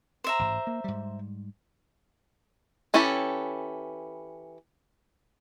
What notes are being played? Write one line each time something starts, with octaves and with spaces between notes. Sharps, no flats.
C5 E5 A#5
A1 G#2
A#3
G#2 G3
E3 C#4 E4 G4 A4